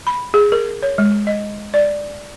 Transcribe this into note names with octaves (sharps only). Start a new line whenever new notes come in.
B5
G#4
A#4
C#5
G#3
D#5
D5